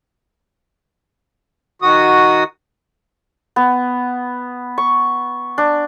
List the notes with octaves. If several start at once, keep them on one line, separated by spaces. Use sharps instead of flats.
D#3 F#4 D#6
B3
C#6
D4